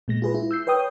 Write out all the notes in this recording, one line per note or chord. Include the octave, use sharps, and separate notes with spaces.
A#2 G#3 A#6
F4 G#4 B4
E4
E6 G6 C7
B4 C#5 G5 D#6 G6